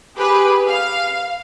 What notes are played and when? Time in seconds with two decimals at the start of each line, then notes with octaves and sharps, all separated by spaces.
0.16 G4 G#4 B4
0.69 F5